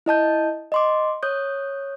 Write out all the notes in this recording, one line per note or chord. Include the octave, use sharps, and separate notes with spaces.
E4 D#5 A5 G6
D#5 C6 D6
C#5 D#6 F#6 G6